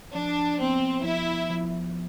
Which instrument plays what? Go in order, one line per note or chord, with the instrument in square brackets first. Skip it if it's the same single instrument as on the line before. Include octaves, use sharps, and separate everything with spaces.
[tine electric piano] F3 [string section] D4
[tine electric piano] B3 [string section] C4
[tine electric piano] F3 [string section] E4
[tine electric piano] F3